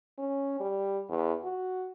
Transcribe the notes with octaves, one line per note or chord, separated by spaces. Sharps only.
C#4
G3
E2
F#4